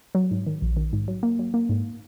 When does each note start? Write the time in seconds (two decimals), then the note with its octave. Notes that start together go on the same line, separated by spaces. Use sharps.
0.15 F#3
0.31 G#2
0.47 D#3
0.62 A#1
0.77 D#3
0.93 G#2
1.08 F#3
1.23 A#3
1.39 F#3
1.54 A#3
1.69 G#2